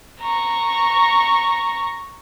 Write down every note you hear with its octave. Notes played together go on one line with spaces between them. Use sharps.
A#5 C#6